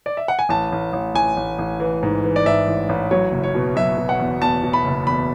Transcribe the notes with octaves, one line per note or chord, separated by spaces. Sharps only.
D5
E5
F#5
G#5
A1 A5
A1
A1
A1 G#5
A1
A1
E3
G#2
E3
D5
G#2 E5
A1
A1
F#3 C#5
F#1
C#5
B2
F#3 E5
B2
F#5
E2
E2 A5
B2
B5
F#1
E2 B5